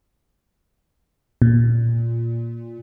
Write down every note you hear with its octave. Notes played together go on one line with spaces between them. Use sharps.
A#2